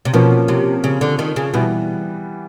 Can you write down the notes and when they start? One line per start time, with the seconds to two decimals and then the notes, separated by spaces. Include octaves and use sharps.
0.05 C3
0.13 B2 F3 A#3 C#4
0.48 C3
0.84 C#3
1.01 D3
1.19 D#3
1.36 C#3
1.54 B2 E3 G3 B3